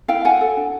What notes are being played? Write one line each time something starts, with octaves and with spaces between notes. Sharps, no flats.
E4 F5 G5
F#4 F#5 G#5
A4
D4